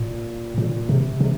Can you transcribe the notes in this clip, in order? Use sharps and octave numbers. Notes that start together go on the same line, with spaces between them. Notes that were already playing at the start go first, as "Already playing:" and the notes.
Already playing: A#2
A#2
C3
C3